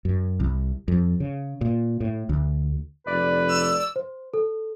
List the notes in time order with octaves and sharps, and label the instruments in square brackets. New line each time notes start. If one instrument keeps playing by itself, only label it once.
[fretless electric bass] F#2
C2
F2
C#3
A#2
A2
D2
[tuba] F1 [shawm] B4 [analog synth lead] D5
[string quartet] E6
[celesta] C5
A4